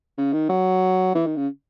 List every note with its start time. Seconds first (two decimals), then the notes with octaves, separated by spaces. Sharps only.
0.18 C#3
0.33 D#3
0.49 F#3
1.15 E3
1.26 D#3
1.36 C#3